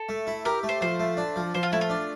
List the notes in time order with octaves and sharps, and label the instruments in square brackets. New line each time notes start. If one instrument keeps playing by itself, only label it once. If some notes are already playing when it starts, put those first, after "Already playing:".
Already playing: [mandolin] A4
[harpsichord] A3
E4
[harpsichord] G4 [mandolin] A#4
[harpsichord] A3
[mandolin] C5
[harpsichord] F3 [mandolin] C5
[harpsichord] A3
D4
F3
[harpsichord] F3 [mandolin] C5
[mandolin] F4
[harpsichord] A3 [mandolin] E4
[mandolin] F4
[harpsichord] D4